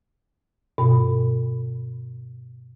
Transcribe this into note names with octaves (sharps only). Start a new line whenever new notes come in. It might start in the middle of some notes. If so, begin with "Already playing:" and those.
G2 B2